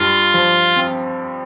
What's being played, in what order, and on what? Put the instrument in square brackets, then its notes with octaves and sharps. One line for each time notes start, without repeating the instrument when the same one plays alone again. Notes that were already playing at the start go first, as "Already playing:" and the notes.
Already playing: [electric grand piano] G2 [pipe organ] F4
[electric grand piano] F3
C4